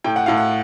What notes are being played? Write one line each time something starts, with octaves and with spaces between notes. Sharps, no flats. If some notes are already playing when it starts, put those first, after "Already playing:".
A2 G5
F#5
A2 F5
F#5